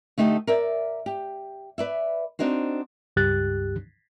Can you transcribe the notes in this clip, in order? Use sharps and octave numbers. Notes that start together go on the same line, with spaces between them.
D3 A3 D#4 G4 A4
A#4 D5 E5
G4
B4 D5 E5
C4 D4 D#4 F#4 C5
C#2 G2 G4 F#6 A6